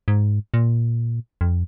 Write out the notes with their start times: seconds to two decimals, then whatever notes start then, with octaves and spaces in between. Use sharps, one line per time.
0.08 G#2
0.54 A#2
1.41 F2